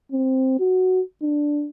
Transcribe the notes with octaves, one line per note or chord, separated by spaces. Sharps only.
C4
F#4
D4